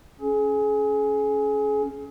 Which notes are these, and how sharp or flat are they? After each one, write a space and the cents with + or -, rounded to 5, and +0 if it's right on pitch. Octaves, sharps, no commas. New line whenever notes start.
C#4 +0 G#4 +35